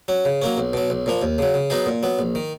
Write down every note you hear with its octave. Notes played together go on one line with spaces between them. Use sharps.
F#3 C#4
C#3
F#3 A#3 C#4
B1
B2 F#3
B1
A#2 F3 A#3
D#2
C#3 F#3
C#3
F#3 B3 D#4 G#4
A#2
F#3 B3
A#1
D#3